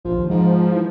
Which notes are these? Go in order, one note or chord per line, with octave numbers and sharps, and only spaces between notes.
A#1 F3
D#2
G#2 F3
E3